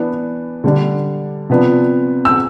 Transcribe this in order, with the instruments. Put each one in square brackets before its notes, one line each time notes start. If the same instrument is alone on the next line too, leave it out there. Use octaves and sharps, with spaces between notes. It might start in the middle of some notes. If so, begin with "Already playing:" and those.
Already playing: [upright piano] E3 B3 D4
D3 G3 D4
C3 F3 B3 D4
E6